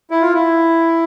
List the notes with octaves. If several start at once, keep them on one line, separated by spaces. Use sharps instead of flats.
E4
F4
E4